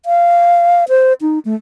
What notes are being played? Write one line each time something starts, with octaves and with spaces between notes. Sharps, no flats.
F5
C5
D#4
A3